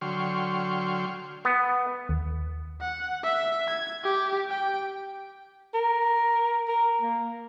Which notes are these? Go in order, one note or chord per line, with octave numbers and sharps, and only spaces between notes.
D3 F#3 G5 C6 C#6 F6
B3
D#2
F#5
E5
G#6
G4
G5
A#4
A#4
A#3